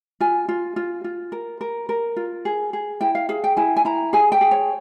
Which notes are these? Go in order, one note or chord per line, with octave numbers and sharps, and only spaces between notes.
F4 G#5
F4
F4
F4
A#4
A#4
A#4
F4
G#4
G#4
E4 G5
F5
G#4 F5
G5
E4 G#5
G#5
E4 A#5
G#4 G#5
G5
G#4
C#5